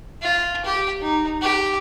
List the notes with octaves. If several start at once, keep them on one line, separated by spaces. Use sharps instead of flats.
F4
G4
D#4
G4